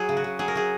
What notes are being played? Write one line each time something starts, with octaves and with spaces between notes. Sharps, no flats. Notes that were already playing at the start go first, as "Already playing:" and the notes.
Already playing: F#3 G#4
C#3
F#4
C#3
F#3 G#4
A#4
F#3 G#4